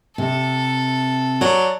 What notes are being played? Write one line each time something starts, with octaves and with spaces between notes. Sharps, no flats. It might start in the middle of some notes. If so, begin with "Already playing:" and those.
C3 A4
F#3 D5